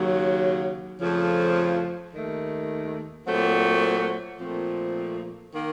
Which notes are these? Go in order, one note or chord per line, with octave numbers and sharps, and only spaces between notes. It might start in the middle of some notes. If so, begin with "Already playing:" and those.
Already playing: D#2 C#3 F#3
F2 C#3 F3 A3
D#2 D#3 A3
A#2 F#3 A3 C4 F#4
A#2 F3 A3 C4
D#3 A#3